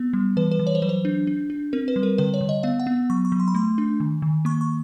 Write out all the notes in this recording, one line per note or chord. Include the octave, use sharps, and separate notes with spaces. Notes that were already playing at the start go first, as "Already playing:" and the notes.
Already playing: B3
G3
E3 B4
B4
E3
C#5
C5
F#3 B4
C5
D4
D4
D4
C4 A#4
B4
G3
A#4
D3 B4
C#5
D3
D#5
B3 F5
F#5
B3
F#3 C#6
C#6
F#3
C6
B5
A3 C6
D4
D#3
D#3
A#3 C#6
C#6